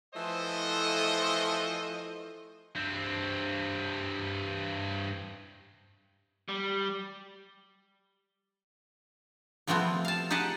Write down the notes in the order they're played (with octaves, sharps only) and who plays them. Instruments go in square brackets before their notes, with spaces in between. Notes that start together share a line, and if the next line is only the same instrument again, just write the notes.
[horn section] E3 F3 A3 A4 C5 D#5
[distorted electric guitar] G2 C4
[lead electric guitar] G3
[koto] C3 F3 G3 A3 B3 C4
F5 A5
D#4 G4 G#4 F#5 A5